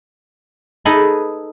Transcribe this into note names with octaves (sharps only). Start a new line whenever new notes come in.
D#4 G#4 A4 B4 D#5 B5